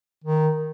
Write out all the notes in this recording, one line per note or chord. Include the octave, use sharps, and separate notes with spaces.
D#3